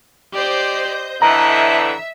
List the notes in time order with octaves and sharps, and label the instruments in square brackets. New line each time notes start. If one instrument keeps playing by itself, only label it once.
[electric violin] G4 D5 [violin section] C5 D#5 G6
[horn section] A2 D3 E3 [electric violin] D#5 F#6 [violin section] E5 [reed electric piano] A#5